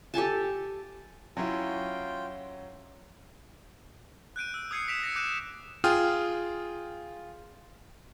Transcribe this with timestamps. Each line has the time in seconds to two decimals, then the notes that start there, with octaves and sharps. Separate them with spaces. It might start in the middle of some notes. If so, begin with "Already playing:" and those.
0.14 G4 A4 G#5 A5
1.37 F#3 C#4 E4 F4 G5
4.36 F#6 G6 D7 D#7
4.54 E6
4.71 D#6 E6 G#6 C7 C#7 D#7
4.88 D#6 B6 D7 E7 F7
5.03 A#6 C#7
5.16 D6 F#6 G6 D#7 E7
5.84 F4 G#4 G5 D#6 F6